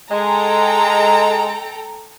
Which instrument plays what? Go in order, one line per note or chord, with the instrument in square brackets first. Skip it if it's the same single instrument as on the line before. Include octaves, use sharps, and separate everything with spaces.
[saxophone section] G#3 [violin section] A4 G5 A#5